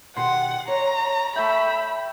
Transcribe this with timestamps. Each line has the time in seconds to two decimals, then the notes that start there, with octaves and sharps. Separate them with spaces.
0.17 B2 D#3 G4 F#5 C6
0.68 C#5 A#5
1.36 A3 E5 G5 B5